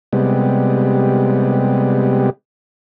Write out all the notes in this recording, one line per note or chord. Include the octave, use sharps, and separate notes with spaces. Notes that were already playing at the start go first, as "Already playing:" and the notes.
C3 G3 G#3 B3